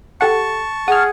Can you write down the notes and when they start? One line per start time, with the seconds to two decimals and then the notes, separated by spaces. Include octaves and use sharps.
0.21 G4 A4 F#5 A5 C#6
0.88 G#4 F#5 D#6 F6